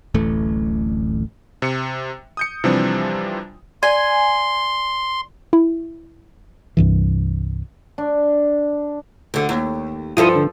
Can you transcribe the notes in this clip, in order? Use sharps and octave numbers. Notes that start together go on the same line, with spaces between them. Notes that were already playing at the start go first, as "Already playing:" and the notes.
D1 A1 E3 A3
C3 C#7
D#6 G6 C#7
C3 E3 F3 G3 C4 D4
D5 G#5 C6
E4
C2 G2 E3
D4
D2 D3
D#2
G2 F3 E4 F4 A4 D#6
D3